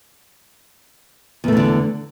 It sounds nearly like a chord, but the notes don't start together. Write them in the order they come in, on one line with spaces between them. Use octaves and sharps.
E2 A3 E3 D3